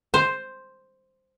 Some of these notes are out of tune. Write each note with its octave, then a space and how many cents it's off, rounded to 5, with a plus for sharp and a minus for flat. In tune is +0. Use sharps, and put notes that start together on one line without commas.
C5 +0